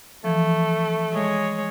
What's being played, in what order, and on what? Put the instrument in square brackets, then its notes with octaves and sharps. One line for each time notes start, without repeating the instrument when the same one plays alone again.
[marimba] E3 F3 [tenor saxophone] A3
[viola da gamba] G#3 C#5